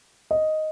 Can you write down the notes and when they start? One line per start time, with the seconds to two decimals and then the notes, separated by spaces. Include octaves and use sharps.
0.31 D#5